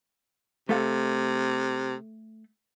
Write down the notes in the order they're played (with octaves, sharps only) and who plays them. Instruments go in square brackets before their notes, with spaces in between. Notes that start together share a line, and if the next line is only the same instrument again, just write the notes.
[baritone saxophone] C3 [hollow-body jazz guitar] A3 A4 F5